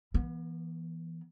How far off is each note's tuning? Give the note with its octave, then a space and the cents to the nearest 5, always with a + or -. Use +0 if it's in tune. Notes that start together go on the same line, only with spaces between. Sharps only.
E3 +10 B3 -35